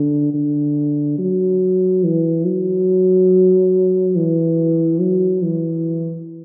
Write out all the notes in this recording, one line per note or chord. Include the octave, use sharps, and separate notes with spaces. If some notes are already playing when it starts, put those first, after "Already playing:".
Already playing: D3
D3
F#3
E3
F#3
E3
F#3
E3